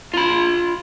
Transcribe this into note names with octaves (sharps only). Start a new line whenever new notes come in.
F4 B5